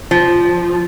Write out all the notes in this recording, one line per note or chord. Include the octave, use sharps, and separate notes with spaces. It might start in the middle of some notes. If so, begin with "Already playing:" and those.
F3